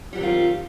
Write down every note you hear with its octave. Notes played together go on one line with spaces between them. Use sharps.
D#3 F#3 G3 C4 F4